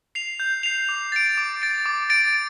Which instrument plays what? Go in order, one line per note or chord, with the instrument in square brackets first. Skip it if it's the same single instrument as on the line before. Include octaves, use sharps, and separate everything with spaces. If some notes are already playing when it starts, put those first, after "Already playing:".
[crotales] C7 F7
G6
C7 F7
D6
A6 D7
D6
A6 D7
D6
A6 D7